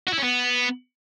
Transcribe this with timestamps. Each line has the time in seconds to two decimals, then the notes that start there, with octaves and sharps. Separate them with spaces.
0.08 F#4
0.14 E4
0.19 C#4
0.24 B3